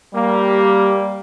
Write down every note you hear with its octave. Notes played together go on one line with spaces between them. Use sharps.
G3 A#3